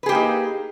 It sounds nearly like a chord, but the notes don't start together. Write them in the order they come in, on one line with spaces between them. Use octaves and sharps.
B4 G#4 G4 A#3 D#4